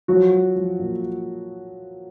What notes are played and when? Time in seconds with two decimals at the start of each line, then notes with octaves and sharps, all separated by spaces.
0.08 F3 F#3 F#4
0.33 F3
0.56 F3
0.79 A#2